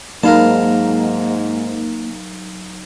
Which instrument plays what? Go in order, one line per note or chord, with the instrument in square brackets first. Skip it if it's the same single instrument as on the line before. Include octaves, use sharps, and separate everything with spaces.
[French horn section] G#2 [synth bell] F#3 D#4 [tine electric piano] A#3 [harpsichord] A#4 F5 A5